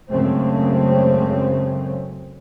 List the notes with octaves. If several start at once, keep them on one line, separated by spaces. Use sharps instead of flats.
F#2 C#3 G#3 A3 C4